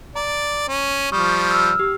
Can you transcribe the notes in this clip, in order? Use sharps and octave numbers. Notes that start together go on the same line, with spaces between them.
D5 A#5
C#4
F3 G3 C#6 D#6 F6
E6 F6
G4